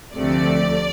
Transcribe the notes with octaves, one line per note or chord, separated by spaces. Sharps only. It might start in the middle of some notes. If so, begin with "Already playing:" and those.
D2 C3 F3 A3 D5